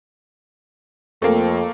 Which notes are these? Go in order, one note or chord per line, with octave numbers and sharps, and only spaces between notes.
F2 A3 A#3